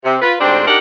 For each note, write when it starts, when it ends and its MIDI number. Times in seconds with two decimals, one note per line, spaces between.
0.04 0.15 48
0.21 0.34 65
0.21 0.34 71
0.40 0.63 38
0.40 0.63 44
0.40 0.63 60
0.40 0.63 62
0.40 0.63 67
0.40 0.63 72
0.67 0.78 62
0.67 0.78 63
0.67 0.78 67
0.67 0.78 70
0.67 0.78 78